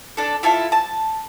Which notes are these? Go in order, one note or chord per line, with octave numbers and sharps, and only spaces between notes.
D4 A4
E4 F4 A4 E5
A5